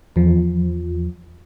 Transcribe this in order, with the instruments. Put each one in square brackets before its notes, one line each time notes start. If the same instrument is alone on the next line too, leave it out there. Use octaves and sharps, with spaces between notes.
[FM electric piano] E2 F3